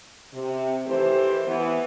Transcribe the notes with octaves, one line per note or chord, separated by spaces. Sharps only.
C3
D#3 E3 A3 G4 C5
E3 B3